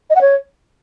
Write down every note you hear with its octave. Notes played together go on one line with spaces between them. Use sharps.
D#5
F#5
C#5